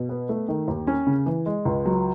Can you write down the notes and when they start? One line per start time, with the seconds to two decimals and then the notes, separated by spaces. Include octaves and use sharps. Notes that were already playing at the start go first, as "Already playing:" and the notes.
Already playing: B2
0.09 B3
0.29 A3
0.48 D#3
0.68 D#2
0.87 C#4
1.07 C#3
1.26 E3
1.46 G#3
1.65 C#2
1.85 F#3